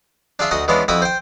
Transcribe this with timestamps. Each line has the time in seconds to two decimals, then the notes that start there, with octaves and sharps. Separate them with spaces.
0.39 D4 F4 G#4 E5 F5 C6
0.51 D2 F#4 D#5 F#5 A5 C6
0.68 E3 G#3 B3 C#4 D4 F4
0.88 F2 E4 F#4 E5 B5 D#6
1.02 C5 G5